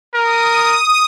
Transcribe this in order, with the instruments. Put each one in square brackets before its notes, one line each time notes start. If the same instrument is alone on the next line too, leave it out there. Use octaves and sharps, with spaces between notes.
[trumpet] A#4 [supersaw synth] D#6